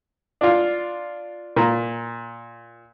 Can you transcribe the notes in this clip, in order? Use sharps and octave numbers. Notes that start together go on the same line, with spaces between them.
D4 F4
A#2